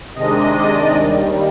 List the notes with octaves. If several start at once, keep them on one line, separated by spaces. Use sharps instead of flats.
C3 D#3 G#3 D4 D#5
D5
D#2 D#3 G3